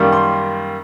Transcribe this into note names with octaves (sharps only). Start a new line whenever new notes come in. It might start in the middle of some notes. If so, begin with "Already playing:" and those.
Already playing: F#2 D#3 G3 A#3
C6